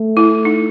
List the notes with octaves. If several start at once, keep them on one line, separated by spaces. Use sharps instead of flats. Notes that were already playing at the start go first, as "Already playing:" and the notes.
Already playing: A3
E4
D#4